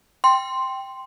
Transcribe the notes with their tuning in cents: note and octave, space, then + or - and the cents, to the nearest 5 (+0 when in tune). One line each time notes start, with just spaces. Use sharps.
G5 +0 C6 +0